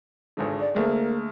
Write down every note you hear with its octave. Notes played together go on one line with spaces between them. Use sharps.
G#1 C#2 D3
D5
D2 G#3 A#3